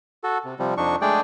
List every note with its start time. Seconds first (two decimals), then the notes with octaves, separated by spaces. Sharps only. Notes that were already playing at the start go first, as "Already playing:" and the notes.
0.24 F#4 A4
0.45 C3
0.59 C3 F3 G3
0.77 F2 D4 D#4 C#6
1.02 G#3 A3 D4 G#4 D5 G5